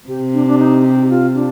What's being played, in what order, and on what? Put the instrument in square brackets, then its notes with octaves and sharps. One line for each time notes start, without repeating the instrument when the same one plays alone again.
[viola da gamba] C3 [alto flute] G4
[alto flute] D4
D4
D#4
G4
F4
D4